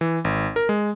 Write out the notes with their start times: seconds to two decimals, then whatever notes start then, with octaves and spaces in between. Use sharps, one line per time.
0.01 E3
0.24 G#1
0.56 A#4
0.69 G#3